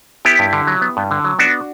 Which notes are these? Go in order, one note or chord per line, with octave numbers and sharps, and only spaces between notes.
B3 E4 G4
G2
D3
F#3
B3
G2
D3
F#3
B3 D4 F#4